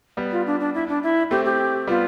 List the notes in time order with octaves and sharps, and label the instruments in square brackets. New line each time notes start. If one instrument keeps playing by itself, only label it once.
[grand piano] G3 B3
[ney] F4
D4
D4
E4
D4
E4
[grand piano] A3 C4 [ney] G4
[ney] G4
[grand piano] G3 B3 [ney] F4